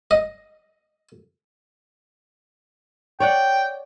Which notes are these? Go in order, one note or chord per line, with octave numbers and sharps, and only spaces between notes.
D#5
C#5 D5 F#5 G5